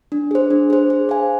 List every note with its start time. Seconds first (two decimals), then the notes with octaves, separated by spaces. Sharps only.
0.12 D4
0.31 G#4 C5
0.50 D4
0.70 G#4 C5
0.90 G#4
1.09 C5 F5 G#5